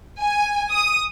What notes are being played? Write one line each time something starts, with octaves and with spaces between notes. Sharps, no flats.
G#5
D#6